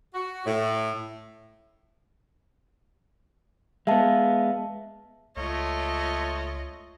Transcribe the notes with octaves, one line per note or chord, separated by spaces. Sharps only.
F#4
A2
G#3 B3 E5 F5 A5
C#2 A3 F4 C#5 D#5